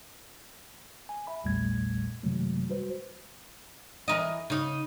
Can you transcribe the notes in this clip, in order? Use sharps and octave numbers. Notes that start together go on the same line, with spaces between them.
G#5
E5 B5
A#1 E2 A#2 G3 A3 G#6
F#2 C3 D#3 F#3 G#3 A3
G3 F#4 B4 C5
E3 A#4 D#5
C#3 D#4